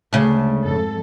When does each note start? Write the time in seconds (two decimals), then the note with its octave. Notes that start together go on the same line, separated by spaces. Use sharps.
0.13 D2 C#3 G#3 A3
0.62 F2 G#2 A4